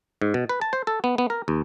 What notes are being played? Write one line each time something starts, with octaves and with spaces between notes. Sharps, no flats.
G#2
B2
B4
A5
C5
A4
B3
B3
A#4
D#2